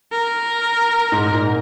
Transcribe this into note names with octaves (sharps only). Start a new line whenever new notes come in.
A#4
G#2
G#2
A#2